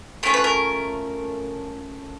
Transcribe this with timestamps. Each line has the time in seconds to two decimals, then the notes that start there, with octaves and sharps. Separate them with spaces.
0.23 A3 C#4 F4 A#4
0.34 B4
0.44 A#4